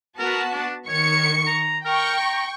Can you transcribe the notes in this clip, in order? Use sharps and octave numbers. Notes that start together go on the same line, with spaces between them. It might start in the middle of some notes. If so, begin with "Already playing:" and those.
B3 F#4 A#4 A5
D4
D#3 C#5 C#6 C#7
A#5
A#4 G5 C#6
A#5